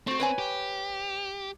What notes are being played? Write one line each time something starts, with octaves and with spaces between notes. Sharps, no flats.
A3 C4 F#4
B4 C#5 G#5
G4